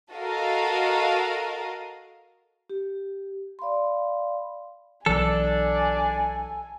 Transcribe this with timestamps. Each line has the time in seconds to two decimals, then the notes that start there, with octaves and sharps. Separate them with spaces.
0.12 F#4 A4 A#4 D#5 F5
2.70 G4
3.59 D5 F5 B5 C6
5.06 B1 E3 D4 A4 G#5